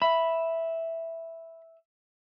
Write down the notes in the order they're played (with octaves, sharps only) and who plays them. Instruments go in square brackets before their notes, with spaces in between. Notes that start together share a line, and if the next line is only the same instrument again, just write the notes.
[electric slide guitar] E5 [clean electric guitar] B5